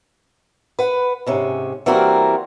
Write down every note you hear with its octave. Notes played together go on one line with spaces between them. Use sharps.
B4 F#5
G#2 C3 C#4
E3 G3 A#3 C4 F#4 A#4